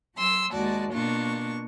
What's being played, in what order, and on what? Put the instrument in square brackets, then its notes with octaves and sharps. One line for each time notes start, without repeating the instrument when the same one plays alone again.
[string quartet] F#3 C6 E6
D#2 G#3 F#4 D5 A5
B2 A#3 D4 F4 C#6